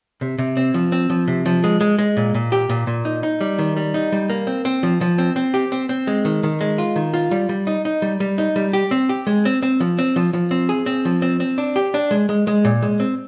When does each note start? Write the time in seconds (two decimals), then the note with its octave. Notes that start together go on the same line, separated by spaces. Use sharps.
0.21 C3
0.38 C3
0.57 C4
0.74 F3
0.92 C4
1.10 F3
1.28 C3
1.46 F3
1.64 G#3
1.81 G#3
1.99 G#3
2.17 A#2
2.34 A#2
2.52 G4
2.69 A#2
2.87 A#2
3.05 D#4
3.23 D#4
3.41 G3
3.59 D#3
3.77 G3
3.94 D#4
4.12 G3
4.30 A#3
4.47 C4
4.65 C4
4.83 F3
5.01 F3
5.18 C4
5.36 C4
5.54 G4
5.72 C4
5.89 C4
6.07 G#3
6.25 D#3
6.43 D#3
6.61 G#3
6.78 F4
6.96 D#3
7.14 F4
7.31 G3
7.49 G3
7.67 D#4
7.85 D#4
8.02 G3
8.20 G3
8.38 D#4
8.56 G3
8.73 G4
8.91 C4
9.09 G4
9.27 G#3
9.45 C4
9.63 C4
9.80 F3
9.99 C4
10.16 F3
10.33 F3
10.51 C4
10.69 G#4
10.86 C4
11.05 F3
11.22 C4
11.40 C4
11.58 D4
11.76 G4
11.94 D4
12.11 G#3
12.29 G#3
12.47 G#3
12.65 A#2
12.83 G#3
13.00 C4